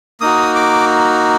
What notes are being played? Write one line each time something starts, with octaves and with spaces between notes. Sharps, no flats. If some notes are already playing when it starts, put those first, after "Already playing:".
A#3 D#4 F#4 D#6
D6